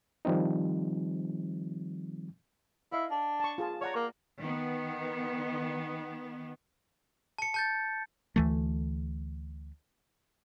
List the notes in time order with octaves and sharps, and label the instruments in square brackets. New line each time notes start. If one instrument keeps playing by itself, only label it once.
[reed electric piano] D#3 F3 G3 C4 D#4
[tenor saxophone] E4 [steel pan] D#5 F5
[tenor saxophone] D4
[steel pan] A5 C#6
F4 G#4 A5
[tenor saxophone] C#5 [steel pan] D5 F#5 A#5
[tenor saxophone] A#3
[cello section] D#3 B3
[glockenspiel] A5 C#7
A5 G6 A6
[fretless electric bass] D2 E3 A3